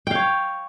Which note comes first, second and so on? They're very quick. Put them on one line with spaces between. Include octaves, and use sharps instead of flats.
G5 F5 C#5